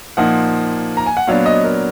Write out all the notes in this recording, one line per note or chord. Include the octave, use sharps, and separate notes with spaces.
A#2 F3 A#3 D#4 F#5
A#5
G#5
F#5
A#2 F#3 B3 D4 F5
D#5
A#4